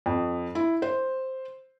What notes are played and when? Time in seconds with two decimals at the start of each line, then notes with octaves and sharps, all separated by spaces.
0.06 F2
0.55 E4
0.82 C5